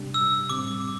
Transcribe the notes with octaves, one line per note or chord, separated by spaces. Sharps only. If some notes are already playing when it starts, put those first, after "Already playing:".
Already playing: C3 G3 D4 G4
E6
A2 G3 C4 D6